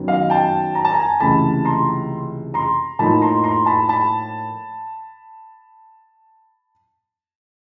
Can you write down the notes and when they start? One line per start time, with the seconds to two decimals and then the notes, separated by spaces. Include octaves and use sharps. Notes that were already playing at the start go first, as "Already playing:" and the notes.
Already playing: F#2 D#3 F#3 B3
0.08 D#5 F5
0.30 G5 A5
0.75 A#5
0.85 A5
0.94 G#5 A#5
1.20 C#2 C3 E3 A3 A5 B5
1.65 A#5 C6
2.54 A#5 C6
2.99 A2 F3 A#3 D#4 A5 B5
3.21 A#5 C6
3.44 A#5 C6
3.66 A5 B5
3.89 A5 B5